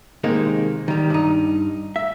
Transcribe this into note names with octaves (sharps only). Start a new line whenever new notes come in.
C3 D#3 G#3 A#3
D#3 G3
G2 D#4
E5